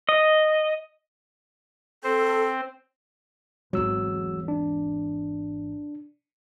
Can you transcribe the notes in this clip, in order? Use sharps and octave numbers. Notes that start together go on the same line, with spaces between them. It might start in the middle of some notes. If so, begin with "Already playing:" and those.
D#5
C4 A4 C5
G#1 E2 F#3 E6
D4